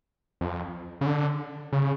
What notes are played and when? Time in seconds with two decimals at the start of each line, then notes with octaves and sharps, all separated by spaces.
0.41 F2
1.01 C#3
1.06 D3
1.72 C#3